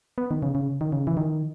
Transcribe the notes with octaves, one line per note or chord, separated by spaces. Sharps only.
B3
D#3
C#3
C#3
D#3
C#3
E3
D#3